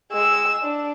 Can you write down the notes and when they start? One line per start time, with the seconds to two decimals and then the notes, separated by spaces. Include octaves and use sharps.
0.13 G#3 E6
0.63 D4